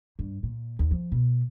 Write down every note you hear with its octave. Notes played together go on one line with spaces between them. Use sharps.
G2
A#2
D#2
F3
B2